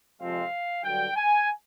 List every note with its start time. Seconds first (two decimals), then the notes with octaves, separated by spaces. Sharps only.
0.21 F2 C3 F3 G#3 C4 F5
0.84 G2 D3 F#3 G5
1.16 G#5